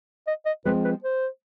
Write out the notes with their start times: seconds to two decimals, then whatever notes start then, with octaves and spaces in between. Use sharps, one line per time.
0.27 D#5
0.46 D#5
0.65 F3 G#3 C4 B4
0.84 B4
1.04 C5